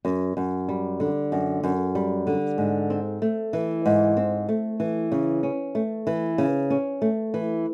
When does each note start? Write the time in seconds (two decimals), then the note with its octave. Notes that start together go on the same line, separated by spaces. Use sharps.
0.05 F#2
0.37 F#2
0.69 G3
1.00 D3
1.32 F#2
1.64 F#2
1.95 G3
2.27 D3
2.58 G#2
2.90 C4
3.22 A3
3.53 E3
3.86 G#2
4.17 C4
4.49 A3
4.80 E3
5.12 C#3
5.43 C#4
5.75 A3
6.07 E3
6.38 C#3
6.70 C#4
7.02 A3
7.34 E3